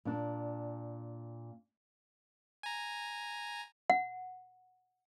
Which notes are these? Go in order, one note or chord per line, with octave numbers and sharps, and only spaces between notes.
A#2 D4
G#5 A#5
F#5